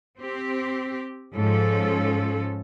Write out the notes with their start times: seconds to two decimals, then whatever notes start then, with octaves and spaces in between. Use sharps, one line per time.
0.19 C4 G4
1.33 G#2 F3 C#4 A4